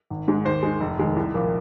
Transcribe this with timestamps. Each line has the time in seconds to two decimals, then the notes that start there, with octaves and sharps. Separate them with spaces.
0.10 G#1
0.28 G#2 G#3
0.45 D#2 C5
0.63 D#3 G#3
0.80 F1
0.99 D#2 D#3 G#3
1.16 C2
1.34 A#2 F3 A#3